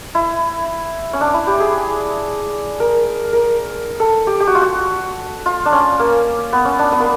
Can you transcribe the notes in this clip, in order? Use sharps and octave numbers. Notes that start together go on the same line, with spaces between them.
E4
C#4
D4
E4
G4
G#4
A#4
A#4
A4
G4
G4
F#4
F4
F#4
F4
D4
C#4
A#3
B3
C#4
D4
B3
A#3